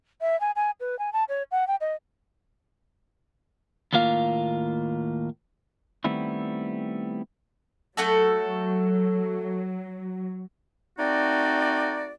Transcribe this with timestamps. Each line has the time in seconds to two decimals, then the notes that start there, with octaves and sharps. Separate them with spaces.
0.21 E5
0.41 G#5
0.56 G#5
0.80 B4
0.99 G#5
1.13 A5
1.29 C#5
1.51 F#5
1.68 G5
1.81 D#5
3.93 D#2 A2 A#3 F4 F5
6.04 D#3 G3 A3 B3 C4 E4
7.97 F#3 A3 F#4 A4
10.99 A3 C4 D#4 F#4 D5